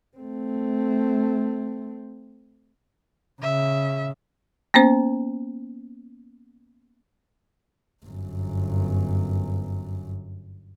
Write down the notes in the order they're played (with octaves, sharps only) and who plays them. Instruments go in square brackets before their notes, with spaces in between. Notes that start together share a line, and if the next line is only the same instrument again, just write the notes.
[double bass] A3 C4
[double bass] C#3 [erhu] E5
[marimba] A#3 B3 C#4 C5
[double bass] G1 F#2